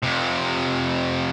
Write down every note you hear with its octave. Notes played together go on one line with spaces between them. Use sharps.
F2 C3